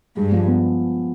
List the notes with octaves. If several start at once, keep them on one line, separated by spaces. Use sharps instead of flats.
G2 G#3
F3
B3